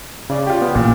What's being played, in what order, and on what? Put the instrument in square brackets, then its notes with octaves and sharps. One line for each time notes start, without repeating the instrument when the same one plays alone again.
[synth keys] C#3 D5
[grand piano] F4 G4
[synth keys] B3
[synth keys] A1 [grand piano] A#2